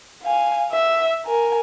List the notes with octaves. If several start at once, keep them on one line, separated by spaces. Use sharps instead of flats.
F5 G#5
E5
A#4 G#5